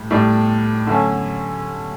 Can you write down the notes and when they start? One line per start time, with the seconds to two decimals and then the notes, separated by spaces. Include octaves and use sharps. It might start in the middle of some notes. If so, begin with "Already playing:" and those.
Already playing: A2 G3
0.11 A2 G3 D4
0.87 D3 F#3 A3 C#4